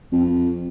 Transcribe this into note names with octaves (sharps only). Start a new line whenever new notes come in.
F2